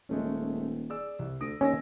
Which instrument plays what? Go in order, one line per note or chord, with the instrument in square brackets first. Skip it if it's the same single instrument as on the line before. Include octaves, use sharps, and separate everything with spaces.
[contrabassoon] D#1 [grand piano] G#3 A3 C#4
[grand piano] G#4 D5 E6
C2
[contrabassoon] D2 [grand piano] D#6 A#6 D7
[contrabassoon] D#2 [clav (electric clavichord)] C#4 [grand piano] G#5 E6 A#6